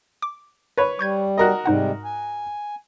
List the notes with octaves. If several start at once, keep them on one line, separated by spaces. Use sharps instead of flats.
D6
B4 C#5
G3 C#6 G6 G#6
F#4 A#4 D#5
G#2 C3 G3 G#3 D#4 F#5
G#5